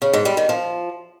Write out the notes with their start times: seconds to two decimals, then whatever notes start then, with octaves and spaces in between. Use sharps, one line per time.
0.02 C#3
0.13 G#2
0.25 G3
0.37 D#3
0.49 F3